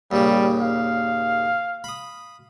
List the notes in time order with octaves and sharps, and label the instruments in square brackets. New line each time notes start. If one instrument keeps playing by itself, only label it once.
[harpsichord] D#2 A#2 C#3 [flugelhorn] G3
[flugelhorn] F5
[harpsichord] B5 D#6